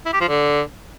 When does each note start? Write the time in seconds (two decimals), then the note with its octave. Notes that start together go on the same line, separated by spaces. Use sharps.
0.06 E4
0.13 G4
0.21 F3
0.28 D3